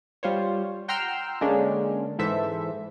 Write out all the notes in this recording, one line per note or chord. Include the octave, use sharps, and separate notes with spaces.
G3 F4 C5 C#5
F#5 G5 A#5 C6 E6 F6
D3 G#3 A#3 C#4 D4
G#2 E3 A4 C5 E5